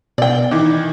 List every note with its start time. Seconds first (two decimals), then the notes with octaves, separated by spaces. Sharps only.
0.18 B2 D5 G5
0.51 D#3 E3 D6